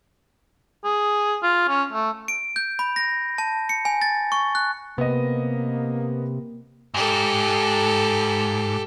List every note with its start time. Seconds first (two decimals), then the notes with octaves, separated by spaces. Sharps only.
0.85 G#4
1.43 F4
1.69 C#4
1.93 A3
2.28 D7
2.56 G6
2.79 B5
2.96 A#6
3.38 A5
3.69 C#7
3.85 G#5
4.02 A6
4.32 C#6
4.55 F#6
4.98 C3 A#3 B3 D#5
6.94 G#2 G4 A4